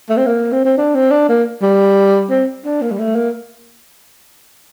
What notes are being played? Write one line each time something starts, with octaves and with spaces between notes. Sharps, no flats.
A3
C4
A#3
C4
C4
D4
C4
D4
A#3
G3
C4
D4
A#3
G3
A3
A#3